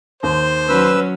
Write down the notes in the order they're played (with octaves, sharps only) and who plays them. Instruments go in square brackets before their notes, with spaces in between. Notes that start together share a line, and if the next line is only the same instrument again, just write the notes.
[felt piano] D#2 [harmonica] C5
[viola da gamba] F#3 C#4 [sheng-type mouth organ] B4 E6